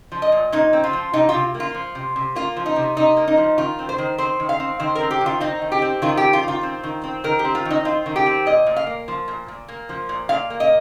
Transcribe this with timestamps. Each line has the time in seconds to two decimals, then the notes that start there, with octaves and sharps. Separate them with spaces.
0.12 F3
0.22 D#5
0.32 A#2
0.52 A#2 D#4
0.73 C4
0.84 F4
0.93 F3
1.14 C3 D#4
1.29 C3 F4
1.54 A#3
1.60 F4
1.74 F3
1.95 C3
2.16 C3
2.36 A#3 F4
2.57 F3
2.66 D#4
2.76 C3
2.97 C3 D#4
3.17 A#3
3.28 D#4
3.37 F3
3.58 D#3 F4
3.79 C4
3.89 C5
3.98 D#3
4.18 C4 C5
4.40 D#3
4.49 F5
4.60 C4
4.80 D#3 C5
4.95 A#4
5.01 C4
5.11 G4
5.21 D#3
5.26 F4
5.41 C4 D#4
5.62 D#3
5.72 G4
5.82 C4
6.02 D#3 F4
6.17 C4 G4
6.33 F4
6.43 D#3
6.48 F4
6.63 C4
6.84 D#3
7.04 C4
7.24 D#3 A#4
7.39 G4
7.44 C4
7.55 F4
7.65 D#3
7.70 D#4
7.85 C4 F4
8.06 D#3
8.16 G4
8.26 C4
8.46 A#2 D#5
8.66 A#2
8.76 F5
8.87 A#3
9.08 F3
9.28 A#2
9.48 A#2
9.68 A#3
9.89 F3
10.09 A#2
10.29 A#2 F5
10.50 A#3
10.60 D#5